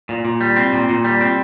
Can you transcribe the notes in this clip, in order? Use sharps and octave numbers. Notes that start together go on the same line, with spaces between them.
A#2
A#2
G3
C4
A#2
A#2
G3
C4